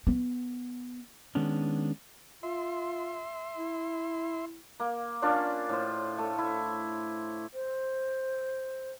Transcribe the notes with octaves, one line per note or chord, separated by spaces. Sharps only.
B3
D#3 G#3 B3 C#4 D4
F4 E5 C6
E4
A#3
A#3 C#4 D4 F4
A2 C5
A3
E4
C5